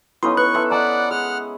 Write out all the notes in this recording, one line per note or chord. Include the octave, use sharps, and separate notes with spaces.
B3 C#4 D#4 E4 A4 F5 C6
B4 C#6 F#6
A4 E5 G5 C6
D5 D#5 F#5 A5 A#5
G#3 F#5 F6